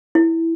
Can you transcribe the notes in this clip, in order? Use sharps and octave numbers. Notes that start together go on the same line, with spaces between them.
E4